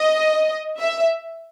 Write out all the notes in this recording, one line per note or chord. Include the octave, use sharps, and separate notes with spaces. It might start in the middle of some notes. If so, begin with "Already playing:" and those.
Already playing: D#5
E5